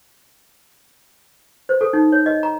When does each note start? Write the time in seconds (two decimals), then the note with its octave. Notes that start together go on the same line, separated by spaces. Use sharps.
1.69 C5
1.81 A4
1.93 D#4
2.12 C#5
2.26 D#5
2.43 A#5